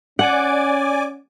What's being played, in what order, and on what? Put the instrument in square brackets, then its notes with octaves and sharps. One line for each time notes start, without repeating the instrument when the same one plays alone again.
[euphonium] C#4 [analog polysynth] D5 G#5 D6 [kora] F#5